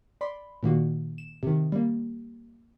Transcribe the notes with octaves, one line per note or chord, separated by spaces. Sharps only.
D5 B5 C6
A#2 D#3 A#3 F#4
E7
C3 D#3
G3 A#3